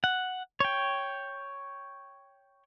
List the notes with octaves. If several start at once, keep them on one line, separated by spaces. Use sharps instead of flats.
F#5
C#5 G5